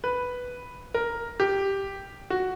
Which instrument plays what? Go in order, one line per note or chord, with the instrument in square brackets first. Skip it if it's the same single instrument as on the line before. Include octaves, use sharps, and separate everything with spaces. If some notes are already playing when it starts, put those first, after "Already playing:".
[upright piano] B4
A#4
G4
F#4